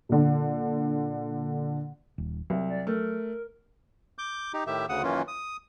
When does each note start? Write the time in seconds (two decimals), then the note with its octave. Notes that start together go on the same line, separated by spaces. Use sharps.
0.09 A#2 D3
2.18 D#1
2.50 C2 F#3
2.69 D5
2.87 A3 A#4
4.18 D6 G6
4.54 D#4 G4
4.67 A2 D#3 G4 E5
4.89 D2 C#3 F#5 D#6
5.03 F#2 D#3 E3 A#3 C#4 F4
5.28 D#6